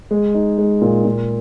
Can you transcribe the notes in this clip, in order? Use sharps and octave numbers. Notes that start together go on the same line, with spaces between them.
G#3
D#4
G#3
A#2
A#2